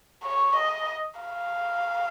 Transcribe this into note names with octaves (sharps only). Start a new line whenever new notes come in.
C#5
D#5
F5